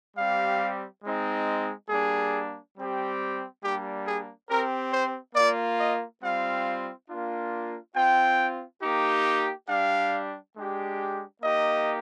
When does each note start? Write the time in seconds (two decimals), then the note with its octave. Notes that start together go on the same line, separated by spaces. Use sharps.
0.17 G3 C4 G4 F5
1.04 G#3 C4 D#4
1.89 G3 A#3 D4 G#4
2.76 G3 C4 G4
3.62 G3 A#3 D4 G4
4.06 G#4
4.49 C4 G4 A#4
4.93 C5
5.35 A#3 F4 D5
5.79 D#5
6.22 G3 C4 F4 F5
7.09 A#3 D4 F4
7.95 C4 F4 G5
8.81 A#3 D#4 G4
9.68 G3 D4 G4 F5
10.55 G#3 D4 G4
11.42 A#3 D#4 G4 D#5